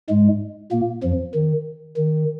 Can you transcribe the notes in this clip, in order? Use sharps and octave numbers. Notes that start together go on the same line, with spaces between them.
G#2 G#3
A#2 A#3
F2 F3
D#3
D#3